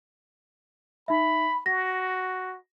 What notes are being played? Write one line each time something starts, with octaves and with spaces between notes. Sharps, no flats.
D#4 E5 B5
F#4 A#6